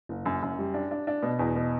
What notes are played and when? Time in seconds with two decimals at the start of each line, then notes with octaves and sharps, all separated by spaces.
0.09 F#1
0.26 F#2
0.42 F#2
0.59 G3
0.74 D4
0.91 D4
1.07 D4
1.23 B2
1.39 E2
1.56 B2